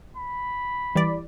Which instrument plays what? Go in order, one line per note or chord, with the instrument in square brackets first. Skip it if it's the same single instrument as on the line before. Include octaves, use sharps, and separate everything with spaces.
[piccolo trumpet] B5
[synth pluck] E3 G3 D5